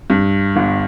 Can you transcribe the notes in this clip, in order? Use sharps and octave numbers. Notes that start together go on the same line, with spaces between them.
G2
G1